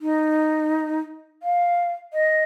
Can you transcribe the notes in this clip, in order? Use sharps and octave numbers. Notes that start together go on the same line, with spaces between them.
D#4
F5
D#5